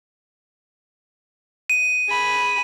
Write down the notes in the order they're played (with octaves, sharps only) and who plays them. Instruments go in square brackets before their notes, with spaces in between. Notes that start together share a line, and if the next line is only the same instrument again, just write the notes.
[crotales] D#7
[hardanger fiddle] G#4 B5